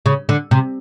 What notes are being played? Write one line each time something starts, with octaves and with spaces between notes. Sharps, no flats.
C#3
D3
C3